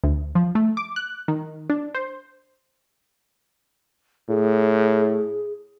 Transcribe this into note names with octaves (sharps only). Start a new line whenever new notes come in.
D2
F3
A3
D6
F#6
D#3
D4
C5
A2 G#4